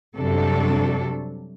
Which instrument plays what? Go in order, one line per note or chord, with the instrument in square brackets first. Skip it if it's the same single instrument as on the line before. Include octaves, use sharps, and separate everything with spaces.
[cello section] F#2 C3 F#3 G3 D4 A4